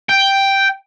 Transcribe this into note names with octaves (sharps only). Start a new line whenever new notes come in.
G5